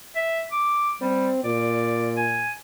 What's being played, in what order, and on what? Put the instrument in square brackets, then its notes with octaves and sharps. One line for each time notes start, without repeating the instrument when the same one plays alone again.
[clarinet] E5
D6
[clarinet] G3 [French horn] C4
[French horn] A#2 [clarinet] D5
[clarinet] G#5